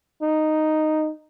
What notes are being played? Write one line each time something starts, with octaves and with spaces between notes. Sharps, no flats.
D#4